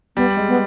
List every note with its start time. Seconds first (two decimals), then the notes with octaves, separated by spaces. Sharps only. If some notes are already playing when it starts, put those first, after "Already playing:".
0.16 G3 B3
0.37 G#3
0.47 B3